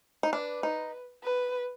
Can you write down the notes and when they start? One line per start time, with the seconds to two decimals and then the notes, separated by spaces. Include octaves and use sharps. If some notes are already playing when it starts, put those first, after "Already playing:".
0.23 D#4
0.32 D4 B4
0.63 D#4
1.24 B4